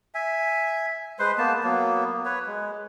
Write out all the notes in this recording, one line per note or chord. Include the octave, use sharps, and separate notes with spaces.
E5 G#5
G#3 B4 C5 C6
A#3 B3 A5
F#3 A#3 B3
B4 C#5
G#3